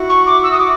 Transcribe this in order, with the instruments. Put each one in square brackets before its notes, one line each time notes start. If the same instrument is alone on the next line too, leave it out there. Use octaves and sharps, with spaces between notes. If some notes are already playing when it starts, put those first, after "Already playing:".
Already playing: [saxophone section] E4 F#4
[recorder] C#6
D6
E6
D#6
D6